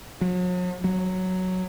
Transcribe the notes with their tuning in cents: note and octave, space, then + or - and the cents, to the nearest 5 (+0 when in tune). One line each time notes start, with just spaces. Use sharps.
F#3 -40
F#3 +0